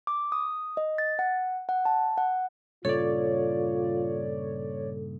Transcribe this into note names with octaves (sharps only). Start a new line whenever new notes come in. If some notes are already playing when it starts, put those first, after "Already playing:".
D6
D#6
D#5
A6
F#5
F#5
A5
F#5
G2 A#2 C#3 F4 A4 C#5 D5